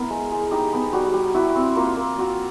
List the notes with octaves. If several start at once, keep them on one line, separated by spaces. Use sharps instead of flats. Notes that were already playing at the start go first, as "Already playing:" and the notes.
Already playing: B3 E4 A#4
G#3
G#3
D#4 G4
B3
G3 F#4
G3
E4 F#4
C4
A#3 F4
A#3
F4 F#4